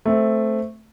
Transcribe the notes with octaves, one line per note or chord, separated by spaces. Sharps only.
A3 C4